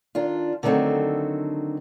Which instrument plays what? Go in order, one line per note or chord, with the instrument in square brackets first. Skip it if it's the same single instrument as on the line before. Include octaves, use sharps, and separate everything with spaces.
[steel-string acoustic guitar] D#3 D4 F4
D3 D#3 F#3 A3 C4